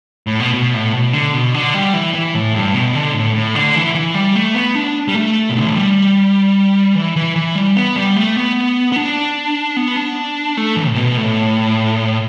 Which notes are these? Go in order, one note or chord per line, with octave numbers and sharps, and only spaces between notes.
A2
B2
B2
A2
B2
D3
B2
D3
G3
E3
E3
A2
G2
B2
D3
A2
A2
D3
E3
E3
G3
A3
B3
D4
G3
A3
B2
D3
E3
G3
E3
E3
E3
G3
B3
G3
A3
B3
B3
D4
B3
D4
A3
E3
A2
B2
A2